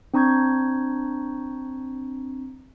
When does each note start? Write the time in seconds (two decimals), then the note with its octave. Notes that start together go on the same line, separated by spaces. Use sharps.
0.14 C4 D4 A#5 C#6 G6 G#6